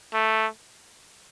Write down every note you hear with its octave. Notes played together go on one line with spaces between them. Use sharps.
A3